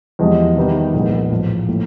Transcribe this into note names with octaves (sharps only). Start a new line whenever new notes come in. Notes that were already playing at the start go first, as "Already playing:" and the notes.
E2 C3 F3 G#3
C3 D#3 G3 B3 D#4
C2 A#2 F3 G#3 B3
A1 A2 F3
A2 F3 A#3